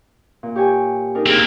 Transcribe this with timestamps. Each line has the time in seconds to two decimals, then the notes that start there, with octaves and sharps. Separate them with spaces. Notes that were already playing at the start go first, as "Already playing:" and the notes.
0.43 A#2
0.56 G4 C#5 G#5
1.15 D4 D#4 A#4
1.26 A#3 C4 D#4 G#4